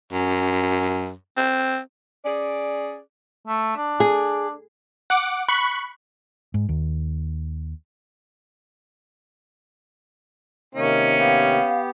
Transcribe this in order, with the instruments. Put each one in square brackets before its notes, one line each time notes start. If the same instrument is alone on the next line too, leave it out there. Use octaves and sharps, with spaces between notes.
[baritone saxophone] F#2
C4
[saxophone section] C#4 G#4 D5
[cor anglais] A3
D4
[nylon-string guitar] G#4
[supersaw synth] F#5 D6
B5 C#6 F#6
[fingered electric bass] G#2
D#2
[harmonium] C3 D#3 A#3 [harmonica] C#4 [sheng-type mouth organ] D#4
[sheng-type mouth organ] B3 G4 [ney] F5